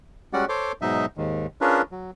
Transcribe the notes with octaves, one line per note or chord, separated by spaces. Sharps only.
G3 G#3 C#4 F#4 D5 F#5
A4 C5 C#5 C6 D6
G#2 B2 F#3 D#4 D#5 E5
D#2 G#2 D#3
C#4 D4 F4 G#4 A#4 B4
F#3